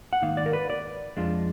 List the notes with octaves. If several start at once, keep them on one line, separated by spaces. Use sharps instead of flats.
F#5
G#2 D#3 A#3 D#4 F5
D5
A#4
B4
D5
F2 F3 G#3 D4 F4